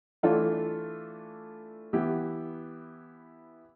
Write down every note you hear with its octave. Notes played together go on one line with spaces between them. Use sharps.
E3 A3 D4 F4 A4
E3 B3 E4 G4